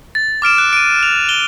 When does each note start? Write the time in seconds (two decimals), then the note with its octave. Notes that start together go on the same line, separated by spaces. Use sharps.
0.15 A6
0.42 D6 F6 D7 E7
0.58 F#6
0.73 D7 D#7
1.03 F7
1.29 G7